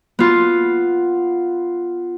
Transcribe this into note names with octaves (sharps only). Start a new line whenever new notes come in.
B3 F4